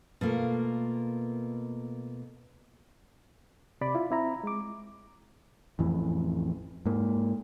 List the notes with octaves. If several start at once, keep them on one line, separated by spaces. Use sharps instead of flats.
B2 A3 A#3 F4 A#4
C3 D5 B5 D6
E4 F4
C4 E4 A#5
G#3 D6
A1 F2 E3
G#2 A#3